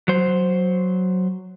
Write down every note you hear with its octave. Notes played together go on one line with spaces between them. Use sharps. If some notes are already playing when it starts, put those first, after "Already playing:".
F#3 C5